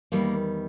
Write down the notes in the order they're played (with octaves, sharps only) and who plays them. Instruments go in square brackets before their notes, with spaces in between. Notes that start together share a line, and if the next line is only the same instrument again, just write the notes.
[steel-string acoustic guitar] E2 D#3 G3 A#3